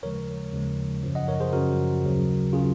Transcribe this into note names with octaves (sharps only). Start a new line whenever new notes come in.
D#2 C#3 F3 G#3 A#4 C#5
D#2 C#3 F3 G#3
F#2 C#3 F3
D#5 F#5
A#4 C#5
G#4 C5
F#2 C#3 F3 F#4 A#4
D#2 C#3 F#3
C#3 F#3 F4 G#4